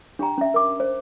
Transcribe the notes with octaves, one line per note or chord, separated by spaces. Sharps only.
D4 G4 G5 A#5
C#4 E5
A#4 D6
C5